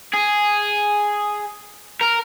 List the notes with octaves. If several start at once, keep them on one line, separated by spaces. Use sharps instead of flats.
G#4
A#4